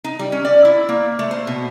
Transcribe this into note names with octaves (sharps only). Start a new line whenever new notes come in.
D#4
G3
C#4
D5
E4
A#3
A3
C5
B2